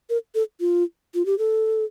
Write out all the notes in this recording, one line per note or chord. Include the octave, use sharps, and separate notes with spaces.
A#4
A4
F4
F4
G4
A4